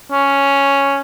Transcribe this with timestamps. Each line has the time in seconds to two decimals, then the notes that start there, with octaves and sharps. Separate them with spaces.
0.12 C#4